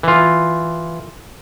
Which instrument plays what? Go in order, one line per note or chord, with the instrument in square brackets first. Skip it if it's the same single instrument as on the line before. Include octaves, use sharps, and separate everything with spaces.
[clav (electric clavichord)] E3 F4